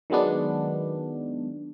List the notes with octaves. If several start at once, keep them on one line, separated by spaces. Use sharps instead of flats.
D#3 F#3 G#3 B3 D4